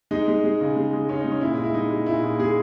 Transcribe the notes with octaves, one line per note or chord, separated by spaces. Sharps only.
G#3 D#4
G#3
G#3
C#3
G#3
G#3
G#3 C#4
D#4
G#3
C#4
A#2 E4
G#3
E4
G#3 D#4
G#3
A#2 E4
G#3
G#3 G#4